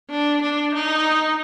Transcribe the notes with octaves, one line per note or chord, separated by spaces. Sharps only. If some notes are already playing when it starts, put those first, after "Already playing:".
D4
D4
D#4